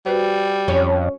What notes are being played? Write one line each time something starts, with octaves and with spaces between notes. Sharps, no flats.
G3 F#4 B4 C5
F2 C#4